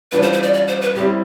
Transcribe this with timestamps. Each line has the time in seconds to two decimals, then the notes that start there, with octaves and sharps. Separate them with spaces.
0.12 A1 A2 G3 D4 F4 B4
0.22 C5
0.33 C5
0.43 D5
0.53 D5
0.67 C5
0.82 B4
0.95 A2 G3 C4 E4 G4